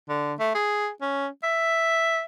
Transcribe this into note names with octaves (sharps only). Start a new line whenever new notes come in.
D3
A3
G#4
C#4
E5